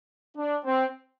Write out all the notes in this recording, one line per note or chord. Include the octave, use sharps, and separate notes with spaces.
D4
C4